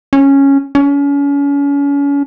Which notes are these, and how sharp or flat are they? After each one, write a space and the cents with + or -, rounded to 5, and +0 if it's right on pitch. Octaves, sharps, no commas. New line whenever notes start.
C#4 -5
C#4 +35